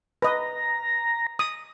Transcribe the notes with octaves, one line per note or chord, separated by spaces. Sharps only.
B4 D#5 A#5
D#6